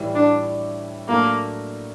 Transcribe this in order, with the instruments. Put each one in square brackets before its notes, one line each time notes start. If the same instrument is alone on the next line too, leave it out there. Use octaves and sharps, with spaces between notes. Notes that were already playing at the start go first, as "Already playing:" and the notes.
Already playing: [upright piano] A2 E3 G3
[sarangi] D4
[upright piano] A2 F#3 A3 D4 [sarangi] A#3